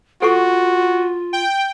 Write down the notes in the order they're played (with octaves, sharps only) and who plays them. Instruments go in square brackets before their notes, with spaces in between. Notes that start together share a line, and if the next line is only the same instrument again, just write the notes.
[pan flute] F4 [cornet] F#4 [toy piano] A4 F#5 C#6
[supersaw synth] G5